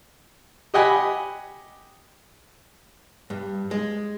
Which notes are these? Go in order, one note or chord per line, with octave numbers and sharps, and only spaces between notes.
G4 D#5 F#5 G#5 B5
G2
G#3